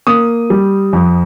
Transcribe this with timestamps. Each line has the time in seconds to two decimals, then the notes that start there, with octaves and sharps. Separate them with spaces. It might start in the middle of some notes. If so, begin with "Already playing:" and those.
0.07 A#3 D#6
0.50 G3
0.93 F2